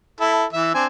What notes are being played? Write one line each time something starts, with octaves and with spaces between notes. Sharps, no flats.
E4 A4
E3 E5
C4 D4 G#5